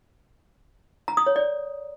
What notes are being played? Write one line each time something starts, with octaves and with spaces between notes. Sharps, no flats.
A#5
D#6
C#5
D5